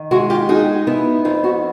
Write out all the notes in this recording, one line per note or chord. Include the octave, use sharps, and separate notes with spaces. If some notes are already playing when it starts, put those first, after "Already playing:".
Already playing: D#3
G#3 E4 F#4
F4 G4
D#4 F#4 G#4
B3 E4
F2 D#4 F4
E4 F#4